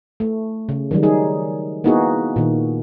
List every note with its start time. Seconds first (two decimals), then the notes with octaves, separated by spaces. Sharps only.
0.20 A3
0.69 C#3
0.91 D#3 F#3 G3
1.03 D#4 G#4
1.84 A#3 B3 D#4 E4 F#4 G#4
2.36 A#2 D#3